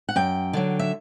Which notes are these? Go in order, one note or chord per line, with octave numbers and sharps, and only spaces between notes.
F#5
F#2 G5
D3 F#3
E5